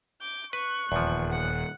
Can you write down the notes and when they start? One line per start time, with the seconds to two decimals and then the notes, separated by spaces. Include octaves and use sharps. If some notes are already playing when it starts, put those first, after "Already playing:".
0.21 D6 G6
0.53 B4 C#6 F#6
0.92 D#1 E2 F3
1.30 F#5 F#6